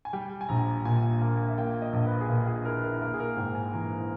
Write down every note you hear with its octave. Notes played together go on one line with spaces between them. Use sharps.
G#5
G3 G5
G#5
A#1 A#5
A#2 G#5
A#3
E5
A#3 G5
D#5
A#1
B4
G#4
A#2 A#4
G#4
E4 A#4
B4
A#4
A#3 A#4
G#4
A#4
G#2 G5
G#5
E3 A#5